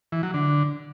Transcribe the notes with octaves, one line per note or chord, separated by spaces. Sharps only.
E3
F#3
D3